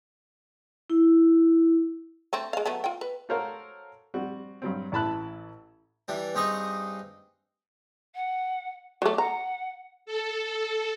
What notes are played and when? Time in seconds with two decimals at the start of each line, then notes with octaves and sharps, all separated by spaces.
0.90 E4
2.33 A3 C4 D4
2.53 G#3 F5
2.66 F#3 A3 B3
2.84 F4 G5
3.01 B4
3.29 F#4 A4 A#4 C5 C#5 F5
4.14 G3 C4 F#4
4.62 G2 F#3 C4
4.92 A1 E4 A5 B5 F#6
6.08 E3 G3 D4
6.35 G2 C4 D#4 G#4 D#5 C#6
8.15 F#5
9.02 F#3 A3 D6
9.18 F#5 A#5
10.06 A4